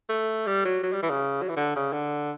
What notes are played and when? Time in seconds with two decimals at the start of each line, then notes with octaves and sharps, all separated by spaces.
0.09 A3
0.47 G3
0.65 F#3
0.83 F#3
0.92 G3
1.02 E3
1.10 C#3
1.42 F#3
1.49 E3
1.56 D3
1.76 C#3
1.93 D3